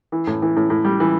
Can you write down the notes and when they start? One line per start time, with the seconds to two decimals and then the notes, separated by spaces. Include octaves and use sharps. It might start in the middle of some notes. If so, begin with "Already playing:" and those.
0.12 E3
0.27 A2
0.42 E3
0.56 A2
0.70 A2
0.85 G3
1.00 E3